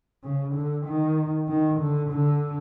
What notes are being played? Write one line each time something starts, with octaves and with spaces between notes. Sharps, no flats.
C#3
D3
D#3
D#3
D3
D3